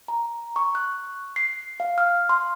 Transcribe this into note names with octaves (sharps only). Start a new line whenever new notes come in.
A#5
C#6
F#6
C7
F5
F6
C6